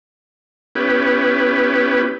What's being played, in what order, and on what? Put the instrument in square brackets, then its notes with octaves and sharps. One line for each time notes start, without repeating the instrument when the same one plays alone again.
[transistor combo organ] B3 C#4 E4 G4 B4